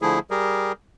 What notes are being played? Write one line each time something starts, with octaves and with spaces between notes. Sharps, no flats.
D3 F3 A3 E4 G#4
G3 G4 G#4 A#4